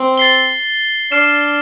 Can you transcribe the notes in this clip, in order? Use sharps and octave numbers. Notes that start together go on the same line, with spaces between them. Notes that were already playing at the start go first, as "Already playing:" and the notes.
Already playing: C4
A6 C7 G7
D4 F6 C7 E7